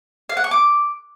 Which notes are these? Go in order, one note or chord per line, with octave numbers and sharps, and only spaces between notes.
F5
F#5
C#6
D6